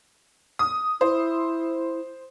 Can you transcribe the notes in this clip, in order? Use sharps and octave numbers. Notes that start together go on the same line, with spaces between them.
D#6
E4 C5